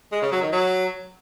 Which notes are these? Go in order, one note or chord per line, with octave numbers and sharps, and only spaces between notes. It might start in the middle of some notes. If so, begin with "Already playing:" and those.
G#3
C#3
F#3
D#3
F#3